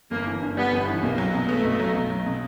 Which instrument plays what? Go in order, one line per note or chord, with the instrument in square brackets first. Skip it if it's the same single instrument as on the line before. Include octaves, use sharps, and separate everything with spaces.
[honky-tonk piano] G1 [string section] A#3
[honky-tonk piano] E3
G2
[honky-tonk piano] G3 [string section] B3
[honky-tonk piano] G1
E3
[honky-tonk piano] B1 [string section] A#3
[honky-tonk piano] F#3
B2
[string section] A3 [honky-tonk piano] B3
[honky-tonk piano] B1
F#3
B1
F#3
B2